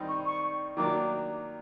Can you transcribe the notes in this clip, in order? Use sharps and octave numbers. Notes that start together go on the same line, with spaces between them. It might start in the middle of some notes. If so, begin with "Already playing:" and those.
Already playing: D#3 G3 C4 D#4
C#6
C#6
D#3 F#3 A#3 D4 D6